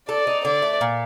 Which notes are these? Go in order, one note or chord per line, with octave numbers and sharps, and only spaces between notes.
A4 D5
D#4
D3 D5
A3
A#2